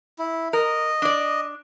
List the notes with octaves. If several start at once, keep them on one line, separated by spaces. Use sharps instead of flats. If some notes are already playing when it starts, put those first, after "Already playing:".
E4
A#4 D#5
D4 D5